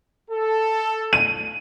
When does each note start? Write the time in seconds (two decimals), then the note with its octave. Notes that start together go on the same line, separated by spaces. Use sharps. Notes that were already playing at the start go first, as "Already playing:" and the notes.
0.31 A4
1.13 D#7